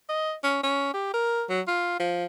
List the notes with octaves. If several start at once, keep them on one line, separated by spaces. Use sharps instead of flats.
D#5
C#4
C#4
G4
A#4
F#3
F4
F3